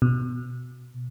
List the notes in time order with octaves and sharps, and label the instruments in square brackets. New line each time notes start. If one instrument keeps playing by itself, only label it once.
[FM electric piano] B2